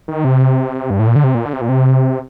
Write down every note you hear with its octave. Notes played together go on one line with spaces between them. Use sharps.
D#3
C3
G2
A2
A#2
D3
C3
A#2
D3
C3
A#2
C3